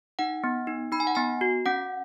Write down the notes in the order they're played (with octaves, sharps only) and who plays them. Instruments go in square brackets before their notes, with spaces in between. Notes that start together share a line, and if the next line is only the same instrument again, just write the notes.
[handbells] D#4 F#5
B3
D#4
D#4 B5
G#5
F#5
B3 G#5
F#4
C#4 F#5